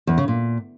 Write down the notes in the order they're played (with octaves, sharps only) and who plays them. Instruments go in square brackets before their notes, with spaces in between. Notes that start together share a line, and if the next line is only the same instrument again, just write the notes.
[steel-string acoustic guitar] E2
C#3
A#2